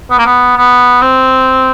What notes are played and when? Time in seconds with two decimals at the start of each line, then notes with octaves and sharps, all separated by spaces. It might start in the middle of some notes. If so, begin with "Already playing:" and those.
0.11 B3
0.18 A#3
0.26 B3
0.57 B3
1.02 C4